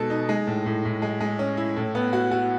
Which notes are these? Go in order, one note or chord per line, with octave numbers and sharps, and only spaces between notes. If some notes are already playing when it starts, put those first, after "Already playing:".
Already playing: B2 G#3 D#4 A4
D#4
G#3
A2
A2
A2
G#3
G#3
C#4
E4
A2
B3
F#4
F#4